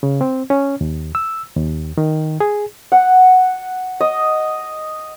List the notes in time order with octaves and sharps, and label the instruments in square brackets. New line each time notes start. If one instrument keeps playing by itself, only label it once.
[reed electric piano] C#3
C4
C#4
D#2
E6
D#2
D#3
G#4
[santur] F#5
D#5